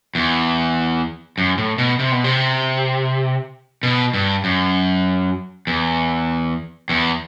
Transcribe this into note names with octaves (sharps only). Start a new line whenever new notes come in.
E2
F#2
A2
B2
C3
B2
C3
B2
G2
F#2
E2
E2